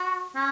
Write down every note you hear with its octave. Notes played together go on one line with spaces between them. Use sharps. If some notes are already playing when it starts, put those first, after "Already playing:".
Already playing: F#4
C#4